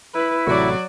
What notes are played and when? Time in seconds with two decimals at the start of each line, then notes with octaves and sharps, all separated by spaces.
0.14 E4 B4
0.47 A1 C3 F#3 A3 F#4 D5